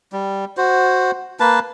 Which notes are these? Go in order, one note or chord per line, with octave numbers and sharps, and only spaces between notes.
G3
F#4 C5
A#3 B4 A5